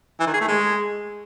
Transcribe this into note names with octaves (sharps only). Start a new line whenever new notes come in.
E3
D#3
G#4
A3
G#3